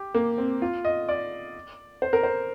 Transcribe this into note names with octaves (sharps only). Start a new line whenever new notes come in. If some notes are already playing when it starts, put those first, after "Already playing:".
Already playing: G4
A#3
C4
F4
D#5
D5
C5
A#4
C5